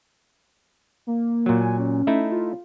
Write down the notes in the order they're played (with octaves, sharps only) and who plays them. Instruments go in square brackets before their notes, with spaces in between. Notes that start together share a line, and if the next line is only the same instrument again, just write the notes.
[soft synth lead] A#3
[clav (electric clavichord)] A#2 F#3
[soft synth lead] G#5
C#4
[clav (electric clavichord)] A3 D#4 E4
[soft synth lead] F4